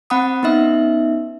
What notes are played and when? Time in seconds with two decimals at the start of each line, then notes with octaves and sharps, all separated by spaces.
0.10 C4 F#5 B5 D#6
0.43 B3 C#4 D#4 E5